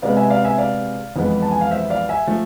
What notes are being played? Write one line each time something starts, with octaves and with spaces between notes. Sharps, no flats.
C3 G#3 B3 D5 F5
E5 G#5
D5 F5
E5 G#5
D5 F5
F2 E3 G#3 B3
A5
G#5
F5
C5 E5
D5 F5
E5 G#5
F3 A3